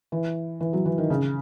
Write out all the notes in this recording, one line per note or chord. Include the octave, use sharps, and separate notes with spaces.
E3
E3
F#3
E3
D#3
C#3